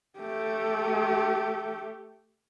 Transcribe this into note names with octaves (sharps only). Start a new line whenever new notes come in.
A3 G4